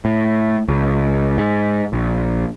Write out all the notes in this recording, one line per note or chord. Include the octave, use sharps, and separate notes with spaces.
A2
C#2
G#2
A#1